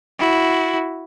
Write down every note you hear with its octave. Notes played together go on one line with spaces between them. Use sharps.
E4 F#4